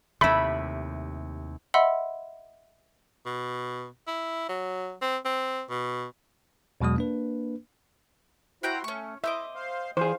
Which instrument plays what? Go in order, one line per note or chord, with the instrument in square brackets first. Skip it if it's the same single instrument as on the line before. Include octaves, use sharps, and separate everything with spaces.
[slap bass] D#2 C3 [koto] A3 E4 [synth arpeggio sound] B5
[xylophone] D#5 E5 F#5 B5 C6 E6
[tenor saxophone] B2
E4
F#3
C4
C4
B2
[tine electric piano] E2 B2 F#3 G#3 D#6
A#3 D4 B4
[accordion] E4 F#4 C5 [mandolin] F#5 G5 A#5
[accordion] A3 [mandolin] C#4 C#6
[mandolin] C4 D#5 D6 [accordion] E4 [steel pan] E5
[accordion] C5 F5
[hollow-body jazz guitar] E3 G#4 [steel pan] C5 [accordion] F5